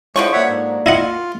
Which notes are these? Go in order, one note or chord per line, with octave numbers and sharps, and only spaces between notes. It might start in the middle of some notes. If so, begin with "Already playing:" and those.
D3 F3 G#3 E4 C#5 C#6
A#3 F#4 C#5 E5 F#5
G#2
E4 F4 D#5 F#5